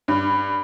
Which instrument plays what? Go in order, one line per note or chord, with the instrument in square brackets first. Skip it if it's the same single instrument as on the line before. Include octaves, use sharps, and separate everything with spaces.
[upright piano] G2